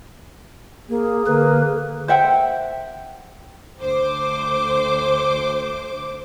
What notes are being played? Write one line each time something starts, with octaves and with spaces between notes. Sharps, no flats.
A#3 G#4
D3 A#3 B4
C5 E5 F#5 G5
D2 C5 D6